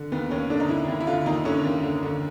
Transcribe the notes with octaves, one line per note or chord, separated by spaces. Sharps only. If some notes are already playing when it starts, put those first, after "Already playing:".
Already playing: D3
D#2 B3
D#2 C#4
D3 D4
D#4
D3 E4
D#2 E4
E4
D3 F4
D#2 D#4
D3 C#4
D#2
D3
D3